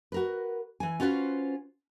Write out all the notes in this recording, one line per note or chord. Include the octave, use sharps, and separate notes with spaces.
F#4 A#4 B4
E3 G#5
C#4 F4 F#4 B4 C5